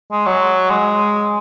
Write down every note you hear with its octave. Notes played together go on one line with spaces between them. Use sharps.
G#3
F#3
G#3